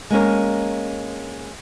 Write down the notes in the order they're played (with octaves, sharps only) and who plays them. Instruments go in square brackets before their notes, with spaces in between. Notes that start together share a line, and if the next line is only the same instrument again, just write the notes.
[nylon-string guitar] G#3 A#3 C#4 A#4